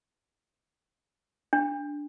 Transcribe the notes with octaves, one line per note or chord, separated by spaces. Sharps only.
D4